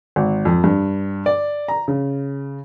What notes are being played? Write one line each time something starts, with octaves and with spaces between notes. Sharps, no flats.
G#1
F2
G2
D5
A#5
C#3